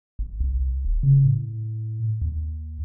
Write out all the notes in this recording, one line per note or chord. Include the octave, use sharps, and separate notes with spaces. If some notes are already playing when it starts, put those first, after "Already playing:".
G1
C2
D#1
C#3
A2
D#2